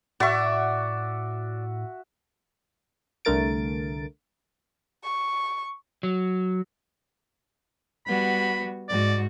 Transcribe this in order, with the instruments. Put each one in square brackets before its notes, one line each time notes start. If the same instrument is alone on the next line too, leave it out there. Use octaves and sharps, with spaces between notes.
[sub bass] A2 [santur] F#4 E5 [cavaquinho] D5 C#6
[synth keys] C2 D3 A3 A#4 A6 D7
[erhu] C#6
[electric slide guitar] F#3
[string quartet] G3 B3 F#4 [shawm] B5
[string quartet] G#2 F#4 [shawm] D5